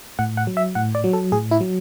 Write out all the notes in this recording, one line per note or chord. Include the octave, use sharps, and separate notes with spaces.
A2 F#5
F#5
F#3
E5
A2 F#5
D5
F#3
A4
A2 G#4
E4
F#3